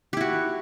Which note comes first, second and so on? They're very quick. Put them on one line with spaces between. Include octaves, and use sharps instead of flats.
G4 E4 F#4